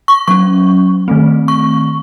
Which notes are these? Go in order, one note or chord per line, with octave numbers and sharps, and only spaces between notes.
C#6
F#3 C#4 C#6
D#3 A3 C4
C#6